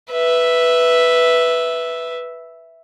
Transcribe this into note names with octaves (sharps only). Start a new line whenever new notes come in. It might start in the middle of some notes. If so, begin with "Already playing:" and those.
B4 E5